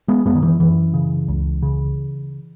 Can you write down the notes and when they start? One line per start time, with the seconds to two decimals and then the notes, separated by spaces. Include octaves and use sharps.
0.08 G#3 B3
0.25 F#2 G#3 B3
0.35 D#3
0.43 E3
0.60 F#2 E3
0.94 C#3
1.28 C#2
1.62 C#3